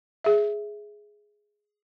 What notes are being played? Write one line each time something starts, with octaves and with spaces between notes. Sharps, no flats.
G#4 E5